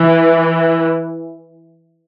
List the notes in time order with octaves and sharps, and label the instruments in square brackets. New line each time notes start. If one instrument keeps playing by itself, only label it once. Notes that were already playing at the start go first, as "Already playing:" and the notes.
Already playing: [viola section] E3